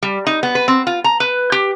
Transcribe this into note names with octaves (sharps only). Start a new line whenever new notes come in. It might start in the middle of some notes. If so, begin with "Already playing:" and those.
G3
D#4
B3
B4
C4
F4
A#5
B4
G4